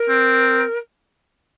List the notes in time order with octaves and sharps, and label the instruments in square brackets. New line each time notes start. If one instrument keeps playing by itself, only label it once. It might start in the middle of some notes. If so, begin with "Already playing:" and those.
Already playing: [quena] A#4
[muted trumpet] C4